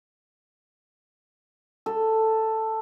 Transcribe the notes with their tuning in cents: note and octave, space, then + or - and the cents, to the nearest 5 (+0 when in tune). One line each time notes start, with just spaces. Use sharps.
A4 +5